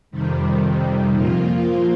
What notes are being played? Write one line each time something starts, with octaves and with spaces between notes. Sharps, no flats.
F2 C3 D#3 G3
A#2 F3 A#3 F4